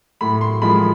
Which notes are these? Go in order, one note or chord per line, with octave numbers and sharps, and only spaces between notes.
A2 B5
C6
F3 G#3 B5